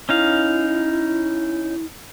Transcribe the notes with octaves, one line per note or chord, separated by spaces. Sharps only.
C#4 D#4 E4 F5